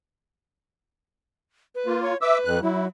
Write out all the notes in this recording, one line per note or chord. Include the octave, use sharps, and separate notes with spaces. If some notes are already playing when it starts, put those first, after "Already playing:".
B4
A#3 F4
C#5
B4 E5 D6 E6
F2 F#6
F#3 E4